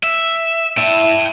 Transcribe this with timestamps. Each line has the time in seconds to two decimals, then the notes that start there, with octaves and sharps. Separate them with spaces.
0.03 E5
0.77 E4 G5 A5